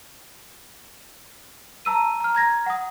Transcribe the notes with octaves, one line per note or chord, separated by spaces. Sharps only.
A5 A#5 E6 D#7
A#5 F6
A#5 G#6 A#6
F#5 D#6